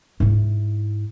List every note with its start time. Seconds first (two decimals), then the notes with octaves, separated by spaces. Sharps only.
0.20 G#2 E4